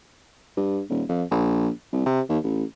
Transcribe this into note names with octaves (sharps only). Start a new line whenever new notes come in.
G2
D#1
F2
A#1
C2
C3
D#2
A1